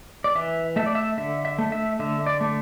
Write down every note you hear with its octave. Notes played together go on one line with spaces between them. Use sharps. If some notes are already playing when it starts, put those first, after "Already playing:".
D5
E3 E5
A3 E5
D5
E5
D3 E5
E5
A3
E5
D3 E5
D5
A3